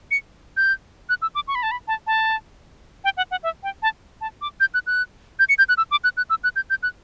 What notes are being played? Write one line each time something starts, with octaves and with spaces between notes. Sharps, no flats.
C#7
G6
F#6
E6
D6
C#6
B5
A5
B5
A5
A5
G5
F#5
F#5
E5
G5
A5
A5
D6
G6
F#6
F#6
G6
C#7
G6
F#6
E6
D6
F#6
F#6
E6
F#6
G6
G6
F#6